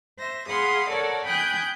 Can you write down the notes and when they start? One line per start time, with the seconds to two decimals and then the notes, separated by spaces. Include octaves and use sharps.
0.18 C5 E5 A#6
0.49 G#4 F5 F#5 B5 C6 D#6
0.88 A4 A#4 C#5 D5 F#5
1.25 G5 G#5 B5 D#6 F#6 G6